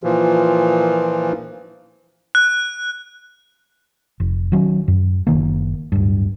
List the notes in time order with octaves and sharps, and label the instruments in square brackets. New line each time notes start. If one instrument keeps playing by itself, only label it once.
[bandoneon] A#2 E3 F3
[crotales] F#6
[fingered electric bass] F1
D#3 F#3 C#4
F#2
F#1 E2 D#3 A#3
D1 G2